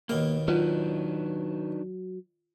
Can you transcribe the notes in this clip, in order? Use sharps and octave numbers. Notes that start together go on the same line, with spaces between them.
D#2 B2 A#3 A#4
F#3 D4 D#4 F4 B4